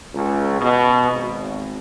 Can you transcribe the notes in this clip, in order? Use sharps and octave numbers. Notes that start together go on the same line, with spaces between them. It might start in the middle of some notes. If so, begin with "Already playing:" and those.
C#2
B2
G#1